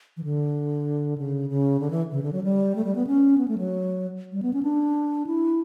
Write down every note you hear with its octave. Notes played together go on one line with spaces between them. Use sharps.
E3
D3
C#3
C#3
D3
E3
C#3
D3
F#3
G3
A3
G3
B3
C#4
B3
A3
F#3
G3
B3
C#4
D4
E4